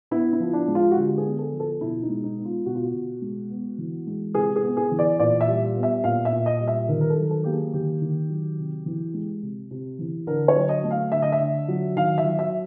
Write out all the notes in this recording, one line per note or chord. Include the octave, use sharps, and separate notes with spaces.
B3 E4
E4
F3
D4
G#3
F4
F#4
D3 G4
G#4
B3
A4
F3
A4
B2 E4
D#4
G#3
D#4
B3
F4
B2 F#4
F4
F#4
B2
G#3
B3
E3
G#3
C3 G#4
G#4
B3
G#4
E3
D5
A#2 D5
E5
G3
B3
E5
A#2 F5
E5
A#2
D#5
G3
E5
D#3 A#4
A#4
A4
F#3
A4
A#3 G4
G#4
D#3 G4
D#3
F#3
C3
E3
G#3
C3
C3
E3
D3 A#4
C#5
F#3
D#5
A3
F5
D3 E5
D#5
E5
D3
F#3
D#3 F5
E5
F#3
E5